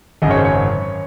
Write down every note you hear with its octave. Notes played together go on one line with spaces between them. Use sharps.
G#1 F#2 C#3 D#5
C#5
C5
C#5